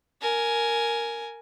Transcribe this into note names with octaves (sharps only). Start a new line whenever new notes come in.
A#4 G#5